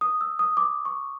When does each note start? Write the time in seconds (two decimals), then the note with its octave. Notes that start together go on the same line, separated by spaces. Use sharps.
0.01 D#6
0.21 E6
0.39 D#6
0.57 D6
0.85 C#6